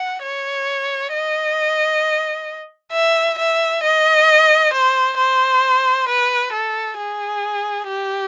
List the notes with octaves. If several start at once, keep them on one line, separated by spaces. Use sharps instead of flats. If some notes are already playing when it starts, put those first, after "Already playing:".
Already playing: F#5
C#5
D#5
E5
E5
D#5
C5
C5
B4
A4
G#4
G4